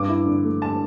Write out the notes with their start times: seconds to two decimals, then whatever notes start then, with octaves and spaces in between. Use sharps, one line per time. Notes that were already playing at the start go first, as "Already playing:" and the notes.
Already playing: G2 D6
0.09 E4
0.26 D3
0.44 A3
0.62 A5